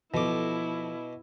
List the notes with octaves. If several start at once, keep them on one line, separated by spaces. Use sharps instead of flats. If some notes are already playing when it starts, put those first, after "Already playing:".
B2 F3 E4 A4 D6